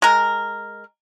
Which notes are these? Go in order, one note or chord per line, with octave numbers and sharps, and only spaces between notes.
G#3 A#4